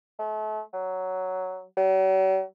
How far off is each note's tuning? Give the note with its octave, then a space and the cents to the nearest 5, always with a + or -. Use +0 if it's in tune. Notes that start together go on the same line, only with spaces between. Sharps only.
A3 -35
F#3 +5
F#3 +45